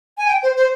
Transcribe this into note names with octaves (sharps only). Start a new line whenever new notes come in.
G#5
G5
C5
C5